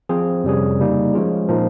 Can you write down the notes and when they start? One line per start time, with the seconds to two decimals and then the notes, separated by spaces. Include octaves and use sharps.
0.09 F3 C4 F4 G#4
0.44 F2 C3 G3 C#4 G#4
0.80 C#3 G3 A#3 D#4
1.13 F3 G#3 C#4 F4 G#4
1.49 A#2 F3 A#3 D#4 A#4